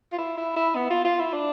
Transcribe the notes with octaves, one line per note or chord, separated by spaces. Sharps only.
F4
E4
E4
E4
B3
F4
F4
E4
D4